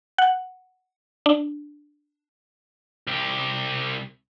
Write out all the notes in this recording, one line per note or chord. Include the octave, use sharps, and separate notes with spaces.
F#5
D4
C2 G4